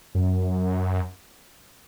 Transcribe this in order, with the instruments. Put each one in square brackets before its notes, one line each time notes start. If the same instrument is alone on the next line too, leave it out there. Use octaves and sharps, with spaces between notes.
[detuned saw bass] F#2